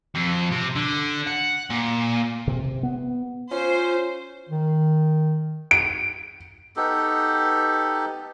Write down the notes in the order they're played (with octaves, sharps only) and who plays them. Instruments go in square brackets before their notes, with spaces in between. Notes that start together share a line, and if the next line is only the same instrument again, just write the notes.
[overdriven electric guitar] F2
C3
D3
F#5
A#2
[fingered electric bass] C3
B3
[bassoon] C#4 [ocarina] F4 [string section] C5
[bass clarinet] D#3
[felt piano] D7
[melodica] B3 D#4 G4 A4